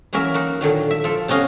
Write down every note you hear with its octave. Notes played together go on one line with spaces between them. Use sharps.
E3 F#3 A#3 C#4 A#4 E5
D#4 F#4 A#4
A#2 D3 D#3 F#3
E5
F3 A4
C3 B3 C#4 D#5 F5